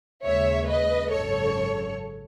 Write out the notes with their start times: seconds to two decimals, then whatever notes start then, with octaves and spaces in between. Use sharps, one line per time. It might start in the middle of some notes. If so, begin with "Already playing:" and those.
0.24 D#2 C#3 G#3 C#5 E5
0.68 B4 D#5
1.11 G#1 F#2 C#3 A4 C#5